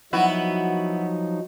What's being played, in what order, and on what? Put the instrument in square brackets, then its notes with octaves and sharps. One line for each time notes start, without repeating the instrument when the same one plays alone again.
[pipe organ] F3 F#3 D#4 [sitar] B3 E4 F#4